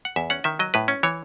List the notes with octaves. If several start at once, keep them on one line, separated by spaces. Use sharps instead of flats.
F#5
E2 E5
C#4 F#5
D#3 E5
F#3 D#5
A2 B4
C#4
E3 C#5